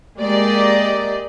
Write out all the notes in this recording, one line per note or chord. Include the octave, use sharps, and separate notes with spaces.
G#3 A#3 G4 D5 D#5